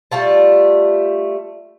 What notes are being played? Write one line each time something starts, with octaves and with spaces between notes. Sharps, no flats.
G3 A3 F4 A5